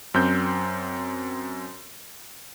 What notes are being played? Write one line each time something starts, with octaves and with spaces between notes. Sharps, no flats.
F#2 C4 G6